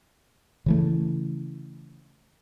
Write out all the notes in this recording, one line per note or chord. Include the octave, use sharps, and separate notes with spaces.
C#3 E3 A3